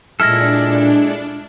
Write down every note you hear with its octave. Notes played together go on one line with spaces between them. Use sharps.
A#2 G#3 D4 E4 A4 F6 A#6